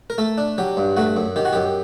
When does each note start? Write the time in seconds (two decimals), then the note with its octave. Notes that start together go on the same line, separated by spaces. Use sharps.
0.10 A#4
0.18 A3 A4
0.38 D4
0.58 F#3 G4
0.77 G2
0.97 A3 F#4
1.17 F#2
1.36 D#3 G4
1.45 F#4
1.53 F#2 G4